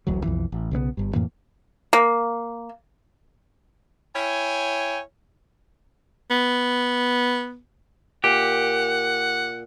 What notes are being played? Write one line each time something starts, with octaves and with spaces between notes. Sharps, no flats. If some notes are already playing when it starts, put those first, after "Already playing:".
D1 A1 D2 F#3
B1 F2 E3
A1
B1 C#3 A3 B3
G1 G2
F2 A2 E3 A#3
A#3
E4 C#5 G5 G#5
B3
A#2 G4 F#5